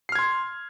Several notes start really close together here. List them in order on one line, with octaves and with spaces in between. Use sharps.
C7 F6 G#6 C6